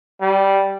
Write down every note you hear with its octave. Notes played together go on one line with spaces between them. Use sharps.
G3